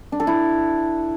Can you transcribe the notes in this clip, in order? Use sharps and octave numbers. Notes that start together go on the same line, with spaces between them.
D4
A4
E4